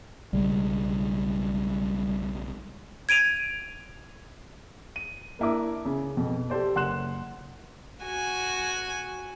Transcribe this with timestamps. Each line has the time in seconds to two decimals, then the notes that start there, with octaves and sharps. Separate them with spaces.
0.33 B1 C#3 G3 G#3
3.09 G#6 D7 D#7 F7
4.96 D#7
5.39 A#3 D4 E4 A#4 D6
5.85 C#3
6.17 F2 B2
6.50 G4 A4 C5 D5
6.75 F#1 F#5 C6 F#6 E7
8.05 F#4 G#5